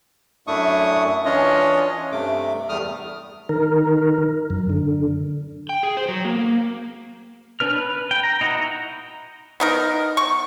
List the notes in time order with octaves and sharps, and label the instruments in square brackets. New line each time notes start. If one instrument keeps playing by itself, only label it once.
[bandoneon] F#2 A3 D4 E4 C#6 D#6
E3 C#4 D4 F4 C#5 D#5
G2 C3 A3 D6
E2 G3 A3 D#6 F6
[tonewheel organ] D#3 A#4
F#2
D3
[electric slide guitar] G5
G#4
C5
F#3
A#3
A#3
[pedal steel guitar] C#4 D4 B4 F6
B4
G5
A#5
D#4 E4 F#4 F#5
[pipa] B3 D#4 A#4
C#6